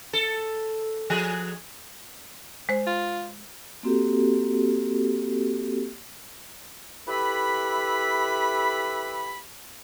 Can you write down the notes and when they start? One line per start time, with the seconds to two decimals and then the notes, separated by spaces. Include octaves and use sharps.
0.13 A4
1.10 F3 G#4
2.69 G#3 C5
2.87 F4
3.83 A#3 C4 F#4 G4 A4
7.07 E4 G4 A4 B4 E5 B5